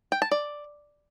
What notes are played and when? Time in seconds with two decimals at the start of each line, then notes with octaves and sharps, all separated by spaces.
0.12 G5
0.22 A5
0.31 D5